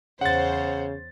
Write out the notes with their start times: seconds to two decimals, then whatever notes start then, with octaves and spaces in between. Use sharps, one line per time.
0.21 E2 C#3 C5 C#5 F#5 A6